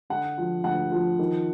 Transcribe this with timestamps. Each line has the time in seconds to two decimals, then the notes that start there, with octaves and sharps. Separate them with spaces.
0.10 D3 F#5
0.38 F3
0.64 D2 F#5
0.92 F3
1.19 D#3